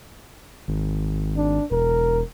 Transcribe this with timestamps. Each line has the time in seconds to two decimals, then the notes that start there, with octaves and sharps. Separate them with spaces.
0.68 G#1
1.37 D4
1.71 E1 A#4